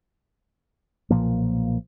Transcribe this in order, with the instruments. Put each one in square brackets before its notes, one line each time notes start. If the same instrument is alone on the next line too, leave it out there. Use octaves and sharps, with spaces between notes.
[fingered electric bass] B1 A#2 F3 A#3